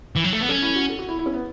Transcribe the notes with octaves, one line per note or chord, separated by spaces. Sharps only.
E3
F#3
A3
B3
C#4 A4
E4
F#4
A4
F#4
E4
E4
C#4
B3